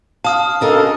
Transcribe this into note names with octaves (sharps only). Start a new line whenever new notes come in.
F5 A5 D#6 F6
D2 C#3 A4 A#4 D#5